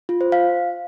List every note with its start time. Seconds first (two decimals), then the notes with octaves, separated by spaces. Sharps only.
0.09 F4
0.21 C5
0.32 F5